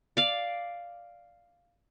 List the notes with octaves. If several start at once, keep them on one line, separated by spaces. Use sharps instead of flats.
D5 F5